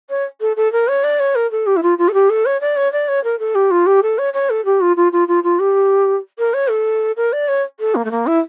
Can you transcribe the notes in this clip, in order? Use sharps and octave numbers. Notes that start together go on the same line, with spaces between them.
C#5
A4
A4
A#4
C#5
D5
C#5
A#4
A4
G4
E4
F4
F4
A4
G4
A4
C#5
D5
C#5
D5
C#5
A#4
A4
G4
F4
G4
A4
C#5
C#5
A4
G4
F4
F4
F4
F4
F4
G4
A#4
C#5
A4
A#4
D5
C#5
A4
A#3
A3
A#3
E4